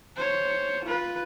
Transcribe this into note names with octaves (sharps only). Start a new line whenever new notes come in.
C5 C#5
F4 B4